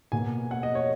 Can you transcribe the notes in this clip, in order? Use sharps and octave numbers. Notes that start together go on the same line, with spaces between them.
B2 A#3 G#5
F#5
D#5
C#5